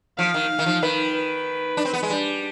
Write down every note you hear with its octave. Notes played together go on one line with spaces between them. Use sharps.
F3 F5
D#3
D#3
F3
D#3 B4
B4
D4
C4
B3
G#3
G3 D4